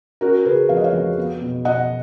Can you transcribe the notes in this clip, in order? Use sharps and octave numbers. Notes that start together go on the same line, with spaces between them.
C#4 F#4 A#4
C#3 G#4 B4
F2 F5
D#5
C#5 F5
F2
B3
B2
B2 D#5 F#5